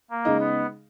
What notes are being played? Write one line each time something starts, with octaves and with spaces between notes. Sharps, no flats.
A#3
C#3 G#3 D#4
B3